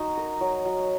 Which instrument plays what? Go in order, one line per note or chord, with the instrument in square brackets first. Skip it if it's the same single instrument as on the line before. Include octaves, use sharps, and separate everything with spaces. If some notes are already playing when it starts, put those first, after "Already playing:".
Already playing: [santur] D#4 F#4
A#4
F#3
F#3